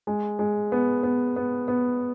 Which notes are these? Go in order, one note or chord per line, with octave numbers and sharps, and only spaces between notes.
G#3
G#3
B3
B3
B3
B3